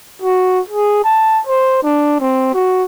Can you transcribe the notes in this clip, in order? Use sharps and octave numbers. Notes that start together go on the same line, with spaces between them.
F#4
G#4
A5
C5
D4
C4
F#4